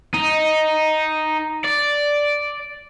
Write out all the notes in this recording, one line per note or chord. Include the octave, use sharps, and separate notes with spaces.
D#4
D5